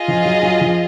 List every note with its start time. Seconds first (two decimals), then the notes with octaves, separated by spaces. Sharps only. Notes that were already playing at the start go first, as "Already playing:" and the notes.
Already playing: F4 G#4 D#5
0.08 F3
0.25 F#3
0.43 F#3
0.61 F3